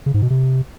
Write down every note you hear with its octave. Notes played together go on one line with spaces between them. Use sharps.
C#3
G#2
B2
C3